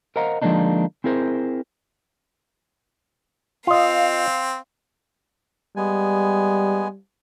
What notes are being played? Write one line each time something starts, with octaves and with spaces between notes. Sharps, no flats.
A#4 C5 D#5 F5 F#5 A#5
D3 F3 G#3 A#3 D4 D#4
C4 E4 G#4 A#4 C5
C4 F4 D#5 F5
G3 G#3 B3 G#5